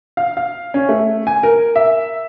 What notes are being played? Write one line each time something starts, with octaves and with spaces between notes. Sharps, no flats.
F5
F5
C#4
A3
G#5
A#4
E5